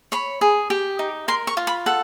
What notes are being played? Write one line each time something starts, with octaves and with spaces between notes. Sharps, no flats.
C#5 B5
G#4
G4
D#4
A#4 C6
C#6
F4
B5
A4 F#5